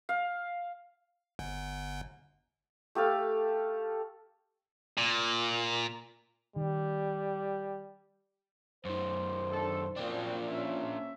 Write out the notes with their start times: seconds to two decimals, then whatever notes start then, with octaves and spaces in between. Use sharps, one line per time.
0.09 F5
1.39 G1
2.95 A3 G4 A4 F5
4.97 A#2
6.56 D#3 G3
8.85 F#2 D#3 C5
9.52 D4 D#4 A4
9.96 F#2 A#2 A#3 C4 D4
10.47 C#4 E5